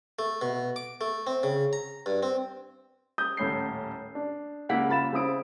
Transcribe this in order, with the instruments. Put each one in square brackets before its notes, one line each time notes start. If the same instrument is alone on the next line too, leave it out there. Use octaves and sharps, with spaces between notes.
[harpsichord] A3
B2
D6
A3
C4
C#3
A#5
G2
C4
[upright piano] D#6 G6
D#1 A2 C#4 G6 C7
D4
C#2 A#3 E4 F#5 B6
F#1 F4 B5 A6 E7
C#3 C4 E4 D#6 D7